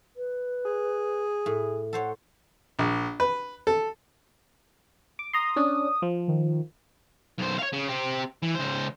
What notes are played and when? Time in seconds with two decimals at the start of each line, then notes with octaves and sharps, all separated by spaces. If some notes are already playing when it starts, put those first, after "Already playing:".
0.16 B4
0.65 G#4
1.46 A2
1.93 A4 C5 C#5 F#5
2.79 A#1
3.20 B4
3.67 A4
5.19 D6
5.33 A#5 C6 D#6
5.56 C#4 D4
6.02 F3
6.28 D#3
7.39 B1 C5
7.59 C#5 F5
7.73 C#3
7.88 C4 G4
8.42 E3
8.55 C#2 C5